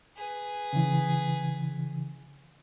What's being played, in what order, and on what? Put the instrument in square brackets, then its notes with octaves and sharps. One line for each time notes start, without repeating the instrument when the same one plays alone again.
[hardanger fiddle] G#4 B4
[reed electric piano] C#3 E3